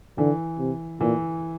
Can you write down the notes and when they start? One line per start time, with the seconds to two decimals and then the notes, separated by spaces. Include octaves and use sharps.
0.18 D3 E3
0.59 C3
1.01 A#2 E3